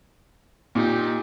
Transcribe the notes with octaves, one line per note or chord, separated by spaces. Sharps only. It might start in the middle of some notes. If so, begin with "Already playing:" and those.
A#2 D#4 G4